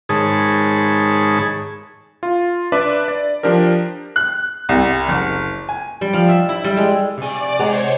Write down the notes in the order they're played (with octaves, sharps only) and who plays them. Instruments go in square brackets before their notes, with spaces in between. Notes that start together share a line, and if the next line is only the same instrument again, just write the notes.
[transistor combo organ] G#2 D#3 G#4 C#5 A5 B5
[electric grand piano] F4
D4 B4 D5 E5 D6
D5
F3 D4 G4 A#4
[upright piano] F#6
C2
F#1
G#5
[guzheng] G3
F3
E5
E4
G3
G#3
[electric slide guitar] C3 G#5 [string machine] D5
[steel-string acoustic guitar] G#3 F#5 A#5 [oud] G#4 [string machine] C5 C#5